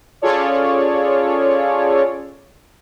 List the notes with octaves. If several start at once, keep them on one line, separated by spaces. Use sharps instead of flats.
C#4 F4 G#4 A4 C#5 D5